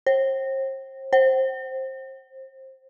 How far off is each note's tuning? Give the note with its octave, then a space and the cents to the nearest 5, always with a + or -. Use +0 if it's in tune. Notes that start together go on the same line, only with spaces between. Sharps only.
C5 +40
C5 +20